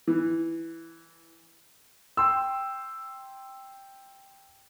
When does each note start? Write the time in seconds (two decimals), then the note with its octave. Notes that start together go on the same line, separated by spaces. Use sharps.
0.08 E3
2.17 G5 C6 E6